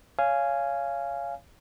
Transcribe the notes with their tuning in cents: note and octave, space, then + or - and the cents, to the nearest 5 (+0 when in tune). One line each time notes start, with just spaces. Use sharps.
C#5 +20 F5 -15 G#5 +0